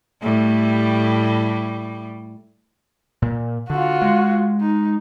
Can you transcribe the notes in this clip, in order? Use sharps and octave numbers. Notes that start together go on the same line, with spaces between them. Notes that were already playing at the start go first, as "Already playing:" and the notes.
A2 G3 A3
A#2
D3 F4 F#4
G#3
D#4